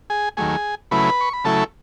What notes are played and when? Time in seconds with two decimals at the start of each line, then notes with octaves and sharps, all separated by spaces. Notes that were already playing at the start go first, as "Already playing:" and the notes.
0.10 G#4 G#5
0.37 D#2 D#3 F#3 A3 G#4 G#5
0.91 C#3 F#3 A3 E4 B4 B5
1.21 C#6
1.33 B5
1.44 C#3 F#3 A3 E4 A4 A5